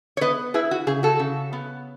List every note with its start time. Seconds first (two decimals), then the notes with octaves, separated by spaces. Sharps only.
0.17 C#5
0.21 B3 B4 D#5
0.54 E4 G#4 B4
0.71 F#4
0.87 C#3 G#4
1.03 F#4 A4
1.19 C#3
1.53 B3